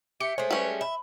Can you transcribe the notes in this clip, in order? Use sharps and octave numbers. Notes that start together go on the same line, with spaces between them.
G4 E5 C#7
G#3 A3 C5 C#5
G3 C#4 B4
E5 B5